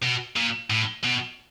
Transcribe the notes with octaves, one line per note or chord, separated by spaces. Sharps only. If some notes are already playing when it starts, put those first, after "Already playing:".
B2
A#2
A2
B2